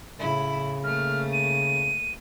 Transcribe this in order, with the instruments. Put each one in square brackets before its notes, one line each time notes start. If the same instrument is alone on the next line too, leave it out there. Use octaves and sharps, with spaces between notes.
[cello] A2 E4 [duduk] C#3
[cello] A3 A#3 [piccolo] F6
[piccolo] D#7